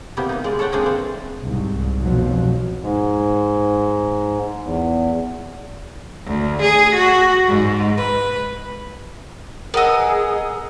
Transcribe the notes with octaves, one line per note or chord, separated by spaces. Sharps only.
C3 A#3 B3 E4 G4
A#3 D#4
G#3 D5
A4 C#5 D5 F#5 G5
G#3 A#3 C4 D4 G#4
E3 C4
C2 G#2
F1 B2 F3 F#3
G#2
E2
D2
G#4
F#4
G#2
B4
B3 G#4 A#4 D#5 F#5 E6